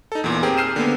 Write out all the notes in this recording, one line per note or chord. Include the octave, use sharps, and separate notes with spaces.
D#4 A4
E2 A#2
C4 G4 G#4 A#4
E6 F6 G6 C7 D#7 E7
D3 A#3 B3